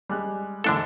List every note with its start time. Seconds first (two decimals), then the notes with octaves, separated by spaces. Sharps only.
0.10 G3 G#3 F#6
0.64 E2 G#2 D3 A3 D4 A4